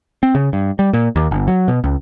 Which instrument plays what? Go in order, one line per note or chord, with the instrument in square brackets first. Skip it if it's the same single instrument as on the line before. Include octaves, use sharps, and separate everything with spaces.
[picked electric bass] C4
C#3
G2
G3
A#2
D#2
G1
F#3
B2
C#2